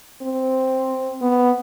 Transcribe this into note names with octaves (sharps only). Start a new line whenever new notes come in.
C4
B3